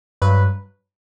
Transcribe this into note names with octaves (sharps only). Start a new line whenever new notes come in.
G2 F#3 B4